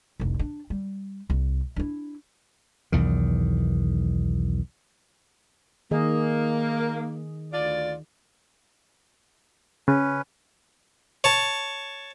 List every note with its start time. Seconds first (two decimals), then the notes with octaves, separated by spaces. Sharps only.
0.20 F1 C2
0.39 D4
0.70 G3
1.30 C2
1.76 D4 E4
2.92 B1 E2 D#3
5.91 D#3 A#3 G#4 D#5
7.52 D2 F4 D5
9.88 C#3 C#4 B4
11.24 C#5 A5